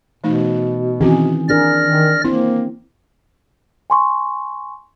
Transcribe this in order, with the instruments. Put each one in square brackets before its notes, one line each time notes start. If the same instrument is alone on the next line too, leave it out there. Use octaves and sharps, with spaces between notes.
[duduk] B2 [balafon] E3 A3 D#4
[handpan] D#3 E3 G#4 [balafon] C4 C#4 F#4
[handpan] D4 G#4 A#4 [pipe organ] D5 F6 A#6
[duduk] D#3
[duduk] A#3 [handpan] C4 [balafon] E4
[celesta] G#5 C6 C#6